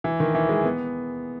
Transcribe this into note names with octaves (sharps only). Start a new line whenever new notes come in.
E3
D#3
E3
G#3
B3